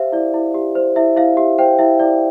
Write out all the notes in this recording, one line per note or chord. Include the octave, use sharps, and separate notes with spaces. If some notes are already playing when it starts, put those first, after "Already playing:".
Already playing: G4 C5 E5 F5
E4 D5
E4
G4
C5
E4 E5
E4 F5
G4 E5
C5 G5
E4 E5
E4 D5